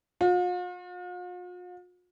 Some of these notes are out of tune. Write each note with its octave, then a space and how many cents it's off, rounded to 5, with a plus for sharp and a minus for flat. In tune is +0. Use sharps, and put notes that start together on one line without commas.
F4 +45